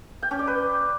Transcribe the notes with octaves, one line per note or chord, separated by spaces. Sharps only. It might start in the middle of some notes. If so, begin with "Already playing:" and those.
G5
C#4
D5
B4